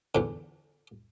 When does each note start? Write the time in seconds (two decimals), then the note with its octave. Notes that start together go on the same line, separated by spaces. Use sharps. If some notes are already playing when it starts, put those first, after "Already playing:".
0.15 E2 D3